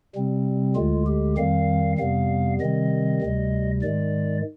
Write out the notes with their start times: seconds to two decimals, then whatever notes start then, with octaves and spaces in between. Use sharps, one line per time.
0.15 C3 G3 C4
0.75 D2 D3 G#3 F4
1.06 G4
1.37 F2 D#3 G3 C4 F5
1.98 F2 C3 G3 B3 F5
2.60 C3 D#3 G3 C4 D#5
3.22 D2 C3 G3
3.82 G#2 D#3 G#3 D5